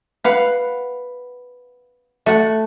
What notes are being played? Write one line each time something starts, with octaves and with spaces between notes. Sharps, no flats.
B4 F5 F#5
A3 F#5